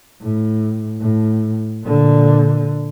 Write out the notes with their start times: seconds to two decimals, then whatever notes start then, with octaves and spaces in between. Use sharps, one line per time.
0.21 A2
1.00 A2
1.83 A#2 D3